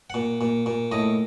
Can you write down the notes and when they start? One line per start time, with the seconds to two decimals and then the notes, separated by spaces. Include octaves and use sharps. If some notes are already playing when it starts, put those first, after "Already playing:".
0.10 A#2 F#5
0.41 A#2
0.66 A#2
0.92 A2 D#5